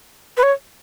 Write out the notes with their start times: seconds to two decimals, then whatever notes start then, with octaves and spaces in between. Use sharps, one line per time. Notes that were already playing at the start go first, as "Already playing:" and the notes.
0.37 B4
0.43 C#5